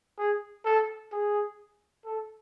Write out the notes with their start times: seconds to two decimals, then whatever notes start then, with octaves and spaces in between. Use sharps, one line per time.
0.18 G#4
0.65 A4
1.12 G#4
2.06 A4